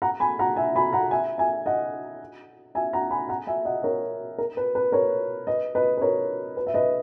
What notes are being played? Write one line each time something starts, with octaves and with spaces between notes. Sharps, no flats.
F#5 A#5
G#5 B5
F#5 A#5
E5 G#5
G#5 B5
F#5 A#5
E5 G#5
E5 G#5
D#5 F#5
E5 G#5
F#5 A#5
G#5 B5
F#5 A#5
E5 G#5
D#5 F#5
A#4 C#5
A#4
B4
B4
A#4 C#5
B4 D#5
B4 D#5
B4
A#4 C#5
B4
E5
B4 D#5